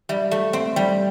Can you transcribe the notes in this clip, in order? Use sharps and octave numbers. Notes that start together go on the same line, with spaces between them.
G3 E5
A3 E5
C4 E5
G3 G5